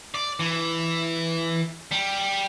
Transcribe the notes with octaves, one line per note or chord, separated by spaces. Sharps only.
D5
E3
G3